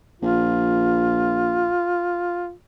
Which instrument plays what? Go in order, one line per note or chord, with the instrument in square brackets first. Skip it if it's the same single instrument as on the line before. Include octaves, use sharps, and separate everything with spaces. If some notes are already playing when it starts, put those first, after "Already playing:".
[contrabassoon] A#1 [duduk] F4